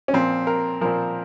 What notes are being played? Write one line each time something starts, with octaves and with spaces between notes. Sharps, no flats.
C#4
A#2 F3 C4
A#4
A#2 F3 A#4